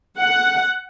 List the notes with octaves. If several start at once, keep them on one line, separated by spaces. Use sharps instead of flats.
F#5